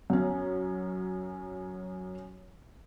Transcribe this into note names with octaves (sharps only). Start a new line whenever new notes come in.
F#2 C#4